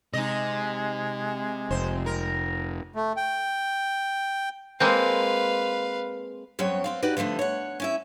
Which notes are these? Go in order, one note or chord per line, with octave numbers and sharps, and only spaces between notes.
C3 G#3 D#4 D#5
F1 C5
A#4
A3
G5
G#3 A#3 C4 B4 F5
F#2 F#3 B3 C4 C#5 G5
B3 C4 F5
D#4 F#4 G4 B4 D5
D3 F3 G3 A3 B3
C#5 F#5
C#4 E4 E5